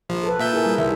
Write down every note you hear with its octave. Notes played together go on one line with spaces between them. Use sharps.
A#1 F3
A4 B4
A#2 E5 G6
E4 G#4 A#4
G3
C2 D#3 E5